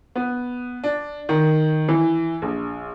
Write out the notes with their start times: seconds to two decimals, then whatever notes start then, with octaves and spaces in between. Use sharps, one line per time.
0.16 B3
0.84 D4
1.29 D#3
1.89 E3
2.42 A#1